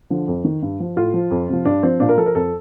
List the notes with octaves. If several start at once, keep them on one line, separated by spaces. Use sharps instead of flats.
D3 F3
F2
D#3
G2
F3
A2 F4
F3
F2
C3 F3
G2 D4
F3 C4
A#2 D4
A#4
F3 A4
A#4
F2 A4